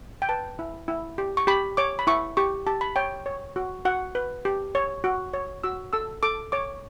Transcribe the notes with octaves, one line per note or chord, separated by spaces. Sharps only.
G5
B4 A5
E4
E4
G4
C#6
G4 B5
C#5 D6
B5
E4 C#6
G4 C#6
G4 A5
B5
C#5 G5
C#5
F#4
F#4 F#5
B4
G4
C#5
F#4
C#5
F#4 E6
A4 E6
A4 D6
C#5 D6